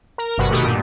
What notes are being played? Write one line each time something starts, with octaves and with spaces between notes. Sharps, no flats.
A#4
G1 G2 C3 F#4 B4 F#5
B2 D#3 A3 F#4 G4 D#6
G2 A#2